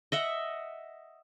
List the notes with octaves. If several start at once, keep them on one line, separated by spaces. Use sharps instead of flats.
D#5 E5 F#5